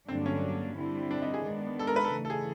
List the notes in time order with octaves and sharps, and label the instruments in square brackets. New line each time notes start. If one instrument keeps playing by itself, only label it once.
[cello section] G2 D3 F#3 A#3 D4 [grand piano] C4
[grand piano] C#4
[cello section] D3 G3 C4 E4
[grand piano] D4
D#4
G#4
[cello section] D#3 G#3 B3 D4
[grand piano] A4
A#4
B4
A4
[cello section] C#3 E3 A3
[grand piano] A4
G#4